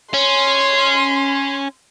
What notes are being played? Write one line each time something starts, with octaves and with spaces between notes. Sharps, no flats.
C#4 C6